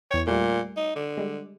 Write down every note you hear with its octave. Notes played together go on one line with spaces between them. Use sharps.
E2 C#5 G5
A#2 G3 A3
D#4
D3
G3 G#3